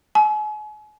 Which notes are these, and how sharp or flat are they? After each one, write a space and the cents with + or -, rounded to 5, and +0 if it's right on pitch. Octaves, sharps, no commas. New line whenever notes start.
G#5 +40